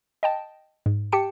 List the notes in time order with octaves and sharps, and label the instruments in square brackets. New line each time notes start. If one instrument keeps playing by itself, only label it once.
[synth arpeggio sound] D#5 G5 A5
G#2
G4 G5 A5 C#7